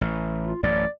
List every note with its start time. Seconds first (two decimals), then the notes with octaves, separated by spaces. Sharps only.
0.01 A1
0.45 F4
0.63 A1 F#2 A2 D5